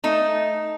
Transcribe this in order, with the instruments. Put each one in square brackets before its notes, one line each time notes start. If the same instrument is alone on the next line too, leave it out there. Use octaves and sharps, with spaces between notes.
[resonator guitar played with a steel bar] A3 D#4